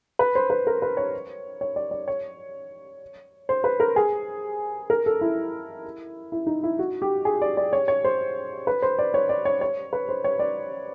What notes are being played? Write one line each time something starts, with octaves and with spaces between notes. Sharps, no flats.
B4
C5
B4
A#4
B4
C#5
C#5
D5
D5
C#5
C5
B4
A#4
G#4
A#4
A4
E4
E4
D#4
E4
F#4
G4
G#4
D5
D5
C#5
C#5
C5
B4
C5
D5
C#5
D5
C#5
C#5
B4
C5
C#5
D5